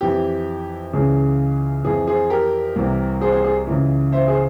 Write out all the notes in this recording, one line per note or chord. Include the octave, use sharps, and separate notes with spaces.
F2 E3 G4
C#2 C#3 E3 G#4
F2 E3 G#4
G#4 C5
G4 A#4
C2 C3 E3
G#4 C5
G#4 C5
G#4 C5
C#2 C#3 E3
C5 E5
G#4 C5